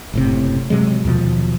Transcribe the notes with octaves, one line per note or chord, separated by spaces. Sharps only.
F#1 A2 C3
C3 F#3 G#3
D#2 B2 F3